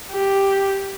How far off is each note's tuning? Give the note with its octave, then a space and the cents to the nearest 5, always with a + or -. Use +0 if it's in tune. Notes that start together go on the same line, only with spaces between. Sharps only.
G4 +0